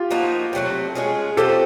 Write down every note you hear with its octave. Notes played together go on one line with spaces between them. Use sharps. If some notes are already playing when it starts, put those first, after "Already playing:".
Already playing: F4 G4
F3 A#3 D#4 F#4
C3 D#3 F#3 A3
G#3 C#4 F4 G#4
F3 A3 C4 F4 G4 A4